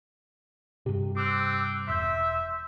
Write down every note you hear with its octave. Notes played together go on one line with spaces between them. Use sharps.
G2 C3 G4
C4 D6 E6 F#6
E1 E5 C6 E6 G6